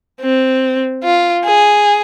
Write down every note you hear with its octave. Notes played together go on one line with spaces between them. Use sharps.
C4
F4
G#4